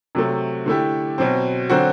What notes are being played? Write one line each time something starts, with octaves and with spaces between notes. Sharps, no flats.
C3 F#3 A3
D3 A3 E4 G4
B2 F#3 C4
D3 F#3 C4 F#4